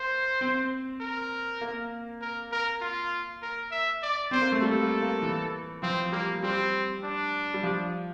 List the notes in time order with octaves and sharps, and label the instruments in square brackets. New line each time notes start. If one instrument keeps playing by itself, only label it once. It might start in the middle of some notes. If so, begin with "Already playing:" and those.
Already playing: [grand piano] A#3 [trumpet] C5
[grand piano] C4
[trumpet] A#4
[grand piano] A#3
[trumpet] A#4
A#4
F4
A#4
E5
D5
[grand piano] C4 [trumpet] C5
[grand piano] A#3
A3
[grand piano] G3 [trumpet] A4
[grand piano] A#3
A#3
E3
[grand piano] F3 [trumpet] C4
[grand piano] G3 [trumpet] A#3
[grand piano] G3 [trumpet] C4
[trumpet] D4
[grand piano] G3
F3